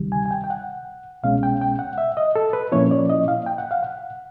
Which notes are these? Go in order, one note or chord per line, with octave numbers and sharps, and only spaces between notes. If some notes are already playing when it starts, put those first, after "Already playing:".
Already playing: D2 C3 D#3 G3
G#5
G#5
G5
G5
F#5
C2 B2 G#3 C#4 F5
G5
G5
F#5
E5
D#5
A4
B4
A#2 F3 A#3 C#4 E4 C#5
D5
D#5
F5
G5
F#5
F5
F#5